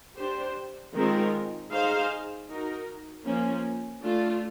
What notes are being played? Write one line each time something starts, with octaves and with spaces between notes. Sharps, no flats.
D4 G4 C5
D#3 G#3 C4 F4 A#4
D#4 G#4 C5 F5
D#4 F#4 A#4
F3 A#3 C#4
A3 D4 F4